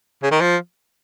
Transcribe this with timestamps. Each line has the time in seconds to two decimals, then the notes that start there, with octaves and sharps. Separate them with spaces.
0.23 C#3
0.32 D#3
0.41 F3